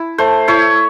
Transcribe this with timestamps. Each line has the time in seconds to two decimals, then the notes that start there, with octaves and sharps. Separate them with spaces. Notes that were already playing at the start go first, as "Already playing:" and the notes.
Already playing: E4
0.18 A3 C5
0.48 E4 C#5